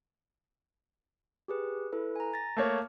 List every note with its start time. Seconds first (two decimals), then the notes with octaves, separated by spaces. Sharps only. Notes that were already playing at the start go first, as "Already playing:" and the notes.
1.48 G4 G#4 B4
1.92 E4 A4 B4
2.16 G#5 A#5
2.34 A6 A#6
2.57 A3 A#3 C#5